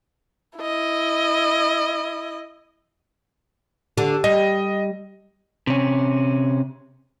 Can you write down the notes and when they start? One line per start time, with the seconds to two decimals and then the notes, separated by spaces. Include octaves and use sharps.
0.58 E4 D#5
3.97 D3 D4 G4
4.24 G3 D#5
5.67 C3 C#4